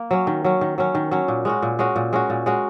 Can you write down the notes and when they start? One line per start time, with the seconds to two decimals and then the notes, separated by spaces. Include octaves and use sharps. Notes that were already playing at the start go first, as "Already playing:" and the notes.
Already playing: A#3
0.11 F#3 C#4
0.27 D#3
0.44 F#3 C#4
0.61 D#3
0.78 F#3 C#4
0.95 D#3
1.11 F#3 C#4
1.28 A#2
1.45 G#3 C#4 F#4
1.62 A#2
1.79 G#3 C#4 F#4
1.96 A#2
2.13 G#3 C#4 F#4
2.30 A#2
2.46 G#3 C#4 F#4